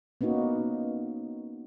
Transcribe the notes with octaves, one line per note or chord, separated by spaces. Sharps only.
A#3 B3 C#4 D#4 F#4